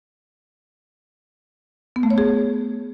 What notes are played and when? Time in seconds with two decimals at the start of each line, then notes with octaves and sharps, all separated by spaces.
1.96 B3
2.03 A3
2.10 C#5
2.18 G#4